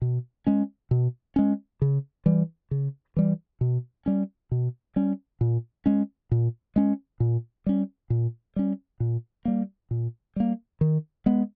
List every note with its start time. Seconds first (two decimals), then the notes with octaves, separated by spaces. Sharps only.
0.02 B2
0.47 G#3 C#4
0.91 B2
1.36 G#3 C#4
1.82 C#3
2.26 E3 G3
2.71 C#3
3.17 E3 G3
3.61 B2
4.06 G3 C#4
4.51 B2
4.96 G3 C#4
5.41 A#2
5.86 G#3 C#4
6.31 A#2
6.76 G#3 C#4
7.20 A#2
7.66 G3 C#4
8.10 A#2
8.56 G3 C#4
9.00 A#2
9.45 G3 A#3
9.91 A#2
10.36 G3 A#3
10.81 D#3
11.26 G#3 B3